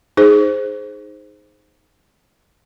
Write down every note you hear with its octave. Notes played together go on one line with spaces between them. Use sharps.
D#4 G#4 C5